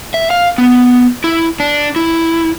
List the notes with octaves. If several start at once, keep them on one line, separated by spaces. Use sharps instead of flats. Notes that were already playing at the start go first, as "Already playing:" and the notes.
E5
F5
B3
E4
D4
E4